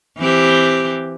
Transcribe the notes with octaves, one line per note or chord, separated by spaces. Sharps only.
E3 C4 G4